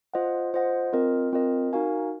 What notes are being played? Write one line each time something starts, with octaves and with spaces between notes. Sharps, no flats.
F4 C5 D#5 F#5
F4 C5 D#5 F#5
C4 F4 A#4 D#5
C4 F4 A#4 D#5
D#4 F#4 A#4 F5 G#5